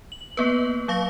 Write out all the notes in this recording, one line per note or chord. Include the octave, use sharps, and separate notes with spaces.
F#7
A#3 B3 B4
F#3 F5 C#6 A#6